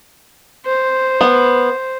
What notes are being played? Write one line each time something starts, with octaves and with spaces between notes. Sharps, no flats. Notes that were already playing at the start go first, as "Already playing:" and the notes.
C5
B3